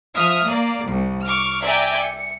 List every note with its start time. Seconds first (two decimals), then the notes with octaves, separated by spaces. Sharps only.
0.14 F3 E5 D#6 F6
0.46 A#3 D5
0.87 C2
1.23 C#6 D6 F6
1.63 D5 E5 G5 G#5 A#5
2.01 C#7